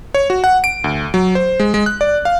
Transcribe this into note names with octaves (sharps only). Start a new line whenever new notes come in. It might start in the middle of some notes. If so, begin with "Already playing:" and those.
C#5
F#4
F#5
D7
D2
F#3
C5
G#3
G#3
F#6
D5
F5